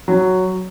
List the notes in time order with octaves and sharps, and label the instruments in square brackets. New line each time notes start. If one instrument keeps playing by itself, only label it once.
[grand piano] F#3